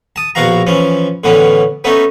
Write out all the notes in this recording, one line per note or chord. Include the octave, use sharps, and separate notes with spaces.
A5 D#6
A#1 B2 F#4 F5 A#5
E3 F3 C#4
A2 D3 E3 B3 C#4
A3 B3 C#4 D#4